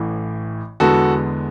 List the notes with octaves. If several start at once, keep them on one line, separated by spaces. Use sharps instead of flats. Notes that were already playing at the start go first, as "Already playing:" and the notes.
Already playing: A1 A2 E3
E2 D3 G#3 B3 F#4 A4